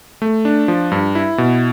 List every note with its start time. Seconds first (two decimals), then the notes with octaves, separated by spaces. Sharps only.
0.22 A3
0.45 D4
0.68 F3
0.92 G2
1.15 E4
1.38 B2